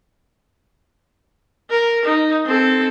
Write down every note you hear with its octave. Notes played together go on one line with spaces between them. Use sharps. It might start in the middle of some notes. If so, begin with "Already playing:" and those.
A#4
D#4
C4 A4